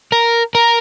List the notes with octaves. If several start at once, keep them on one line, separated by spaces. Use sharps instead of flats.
A#4
A#4